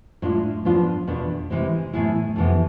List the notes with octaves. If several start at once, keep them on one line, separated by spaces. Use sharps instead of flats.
A2 G#3 D4 F4
G#2 F3 B3 D4 F4
E2 B2 B3 D4
C3 E3 G#3 C4
A2 E3 B3 E4 G#4
F2 C3 E3 B3